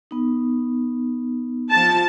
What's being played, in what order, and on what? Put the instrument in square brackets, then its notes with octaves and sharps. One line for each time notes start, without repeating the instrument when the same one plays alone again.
[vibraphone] B3 D#4
[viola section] F3 A5